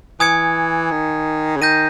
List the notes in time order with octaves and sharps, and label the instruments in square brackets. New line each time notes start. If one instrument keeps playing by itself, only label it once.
[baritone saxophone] E3 [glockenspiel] G#5 D#6 G#6 C#7
[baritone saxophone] D#3
C#3
[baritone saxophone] D#3 [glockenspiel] G6 A#6 D#7